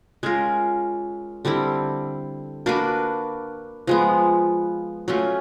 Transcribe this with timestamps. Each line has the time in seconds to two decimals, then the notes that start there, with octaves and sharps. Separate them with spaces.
0.23 G#3 C#4 F4 A#4
1.45 D3 G3 C4 E4
2.66 A#3 D4 F#4 B4
3.87 F3 G#3 B3
5.08 F#3 A3 C#4 F4